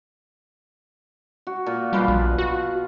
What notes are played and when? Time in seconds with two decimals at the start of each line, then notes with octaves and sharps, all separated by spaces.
1.47 F#4
1.66 A#2
1.93 B2 G3 F4 B4
2.08 A#1
2.38 F#4